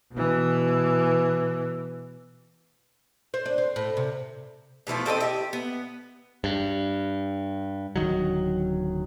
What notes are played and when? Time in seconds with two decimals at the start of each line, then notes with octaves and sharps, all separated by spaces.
0.12 B2 E3
3.34 C5
3.46 D4
3.58 C4
3.76 A2
3.97 C3
4.87 B2 E3 F3 A3
5.06 C4 A4 C5 D#5
5.20 E4 G4
5.53 B3
6.44 G2
7.96 D1 C#2 D#3 F#3